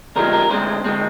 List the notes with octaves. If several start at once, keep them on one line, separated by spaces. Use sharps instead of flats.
D2 C3 F3 G#3 A#4
A#4
D2 D3 G#3 C4 C5
D3 G#3 C4